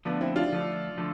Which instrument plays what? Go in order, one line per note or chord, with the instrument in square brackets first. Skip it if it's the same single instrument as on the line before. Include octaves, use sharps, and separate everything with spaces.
[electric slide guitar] D3 F3 A3 [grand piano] B3 D4
[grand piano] C4 E4
D4 F4
[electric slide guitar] D3 F3 A3
D3 F3 A3